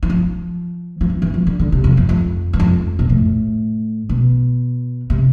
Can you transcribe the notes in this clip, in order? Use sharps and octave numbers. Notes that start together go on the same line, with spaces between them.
E3
F3
F3
E3
E3
F3
D3
D3
C3
F2
E2
F2
G2
F2
B2
A2
B2
C3